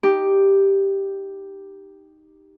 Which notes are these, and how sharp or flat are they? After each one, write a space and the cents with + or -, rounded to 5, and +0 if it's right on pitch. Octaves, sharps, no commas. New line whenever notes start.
D#4 +0 G4 +0